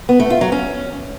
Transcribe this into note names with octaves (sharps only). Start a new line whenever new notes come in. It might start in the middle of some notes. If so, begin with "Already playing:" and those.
B3
A3
F4
F#3
C#4